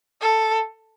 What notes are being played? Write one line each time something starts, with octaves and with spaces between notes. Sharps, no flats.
A4